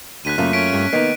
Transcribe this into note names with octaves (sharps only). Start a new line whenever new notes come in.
D2 F#6 B6 D#7
F#2 C#3 A3 A#3 F4
C#4 B6 D7
G2
D#3 A#3 B3 D#4